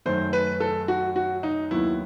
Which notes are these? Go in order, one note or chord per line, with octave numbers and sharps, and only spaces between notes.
F#2 D#3 A3 C5
B4
A4
F#4
F#4
D#4
D#2 D#3 F#3 B3 E4